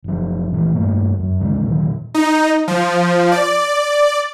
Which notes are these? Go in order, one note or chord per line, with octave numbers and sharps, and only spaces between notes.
F#1 F3
A#1 A#2 E3
G2 A3 A#3
F#2
G#1 D#2 C#3 G#3
A#2 D#3 F#3
D#4
F3
D5